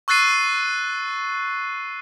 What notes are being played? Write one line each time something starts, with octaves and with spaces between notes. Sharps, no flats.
C#6 E6 F#6 A6 C7 D#7